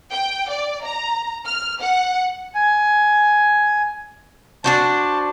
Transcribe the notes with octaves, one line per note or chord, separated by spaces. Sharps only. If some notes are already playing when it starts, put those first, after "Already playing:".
G5
D5
A#5
F6
F#5
G#5
D4 F#4 C5 A5